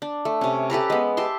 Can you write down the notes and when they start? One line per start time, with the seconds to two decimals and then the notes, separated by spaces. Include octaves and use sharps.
0.02 D4
0.25 A3
0.41 C3 C#4
0.70 G4 A4 B4 A#5
0.90 G#3 B3
1.17 G4 E5 A5 C6